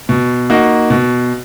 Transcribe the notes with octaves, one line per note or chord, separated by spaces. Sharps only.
B2
A#3 D#4 F#4
B2